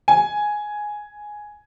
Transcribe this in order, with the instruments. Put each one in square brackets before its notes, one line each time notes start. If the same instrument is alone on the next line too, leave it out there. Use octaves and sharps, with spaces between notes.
[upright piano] G#5